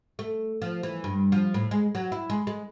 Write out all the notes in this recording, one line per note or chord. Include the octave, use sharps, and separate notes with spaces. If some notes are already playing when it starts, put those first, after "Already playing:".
A3
F3
E3
G2
F3
A2
G#3
F#3
E4
G#3
G#3